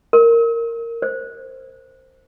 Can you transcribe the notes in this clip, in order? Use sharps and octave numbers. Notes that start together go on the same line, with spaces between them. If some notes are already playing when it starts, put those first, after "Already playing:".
A#4
C5